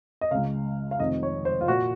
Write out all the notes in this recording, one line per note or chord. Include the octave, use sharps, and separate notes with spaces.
D#5
C#2 C#3 F5
F5
F1 F2 C3 D#3 D#5
C#5
C5
F4
A#2 F#4